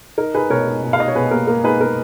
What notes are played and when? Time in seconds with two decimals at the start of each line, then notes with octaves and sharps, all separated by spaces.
0.18 D#4 A#4
0.34 D#4 G#4 B4
0.50 B2 A#4 C#5
0.66 D#4
0.83 B2
0.93 F5
0.99 D#4 D#5
1.08 C#5
1.15 B2 G#4 B4
1.31 A#3 A#4
1.47 A#3 A#4
1.64 D#4 G#4 B4
1.81 A#3 A#4